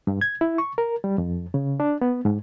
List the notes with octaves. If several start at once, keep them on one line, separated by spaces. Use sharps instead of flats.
G2
G#6
E4
C#6
A#4
G3
F2
C#3
D4
B3
G#2